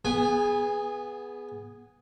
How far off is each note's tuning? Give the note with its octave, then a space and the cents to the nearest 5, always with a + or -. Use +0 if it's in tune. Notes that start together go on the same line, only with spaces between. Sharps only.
B3 +0 G#4 +5 G#5 -25